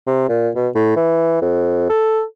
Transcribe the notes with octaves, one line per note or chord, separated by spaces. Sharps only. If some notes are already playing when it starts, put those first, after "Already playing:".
C3
A#2
B2
A2
E3
F2
A4